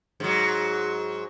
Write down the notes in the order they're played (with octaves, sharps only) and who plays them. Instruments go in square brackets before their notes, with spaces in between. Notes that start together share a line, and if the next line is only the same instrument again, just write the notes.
[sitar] G#2 F#3